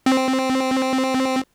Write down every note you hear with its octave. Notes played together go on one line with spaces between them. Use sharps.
C4